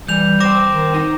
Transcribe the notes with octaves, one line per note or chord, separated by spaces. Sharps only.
E3 G3 G6 F7
C5 G5 D6 A#6 E7
D#3
D#4 A#6